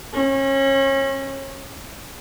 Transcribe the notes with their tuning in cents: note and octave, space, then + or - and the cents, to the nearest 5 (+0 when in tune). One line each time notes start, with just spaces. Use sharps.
C#4 -30